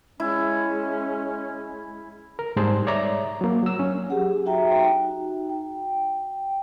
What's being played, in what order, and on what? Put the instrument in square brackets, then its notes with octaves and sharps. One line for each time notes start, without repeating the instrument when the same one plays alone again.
[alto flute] G#3 [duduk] C#4 [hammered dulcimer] E4
[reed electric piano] A#4
G#2 G3 G#4 C5 A5
C#5 D5 E5 A#5 D6
F#3 A#3
F#3 E6
C#4
[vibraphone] F#3 G4 G#4 F#5
D#4 F#4 E5 G5 A#5
D#4 F#4
G5